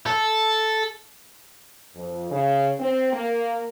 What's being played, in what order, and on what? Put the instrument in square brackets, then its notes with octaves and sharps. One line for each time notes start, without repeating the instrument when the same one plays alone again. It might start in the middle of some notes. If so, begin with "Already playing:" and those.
[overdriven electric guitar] A4
[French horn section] F2
C#3
C4
A#3